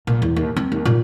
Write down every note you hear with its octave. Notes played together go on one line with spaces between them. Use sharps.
A#2
E2
D#2
C4
D#2
A#2